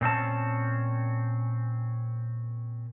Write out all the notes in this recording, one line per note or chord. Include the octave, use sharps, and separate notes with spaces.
A#2 C4 C#4 A5